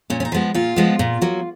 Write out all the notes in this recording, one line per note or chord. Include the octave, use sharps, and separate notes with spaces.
A#2 C#4
C#4
D#4
F3 G#3 B3
A#2 F4
F3 G#3 B3
A#2
F#3 A#3